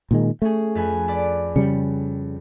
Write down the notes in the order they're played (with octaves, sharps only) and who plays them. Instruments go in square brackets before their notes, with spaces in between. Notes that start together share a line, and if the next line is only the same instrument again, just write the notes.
[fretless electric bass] A#2 D#3 G#3
[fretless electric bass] A3 [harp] C#4 G#4
[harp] F2 B4 G#5
B4 D5 D6
[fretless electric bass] C#3 G3 [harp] C#7